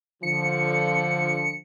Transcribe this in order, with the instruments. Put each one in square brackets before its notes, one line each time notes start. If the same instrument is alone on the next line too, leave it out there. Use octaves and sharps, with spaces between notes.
[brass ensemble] D3 F3 [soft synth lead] C#7